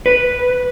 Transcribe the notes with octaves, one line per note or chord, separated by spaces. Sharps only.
B4